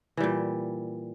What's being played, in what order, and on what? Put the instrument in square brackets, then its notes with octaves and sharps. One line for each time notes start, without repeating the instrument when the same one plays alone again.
[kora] E3
G3
A#2